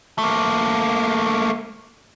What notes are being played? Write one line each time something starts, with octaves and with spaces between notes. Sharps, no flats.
A3 A#3